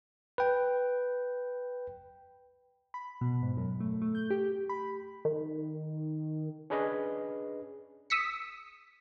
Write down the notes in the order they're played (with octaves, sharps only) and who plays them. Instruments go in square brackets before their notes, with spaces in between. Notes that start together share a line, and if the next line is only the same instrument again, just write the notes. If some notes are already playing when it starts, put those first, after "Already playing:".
[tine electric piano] B4 G5
[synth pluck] B5
B2
G#2
F#2
A3
A3
G6
G4
B5
[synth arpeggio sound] D#3
[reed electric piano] C#4 D4 G#4 B4 D#5
[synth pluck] D#6 E6 B6 C#7